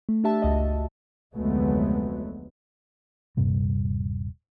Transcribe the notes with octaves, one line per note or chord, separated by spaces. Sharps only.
A3
D4 G4 E5 A5
G1 C#2 F#4 D#5
F1 D2 F#3 G#3 A3 B3
D#1 G2 C3 G3